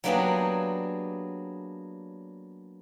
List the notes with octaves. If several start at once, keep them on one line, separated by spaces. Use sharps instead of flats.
F#3 A#3 B3 D4 G4 G#4